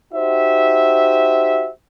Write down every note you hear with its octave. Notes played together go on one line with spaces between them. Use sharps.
D#4 F#4 G4 C5 E5